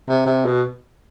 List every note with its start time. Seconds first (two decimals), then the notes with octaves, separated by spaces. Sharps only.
0.08 C3
0.26 C3
0.45 B2